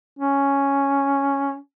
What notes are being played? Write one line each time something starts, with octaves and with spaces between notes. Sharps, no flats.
C#4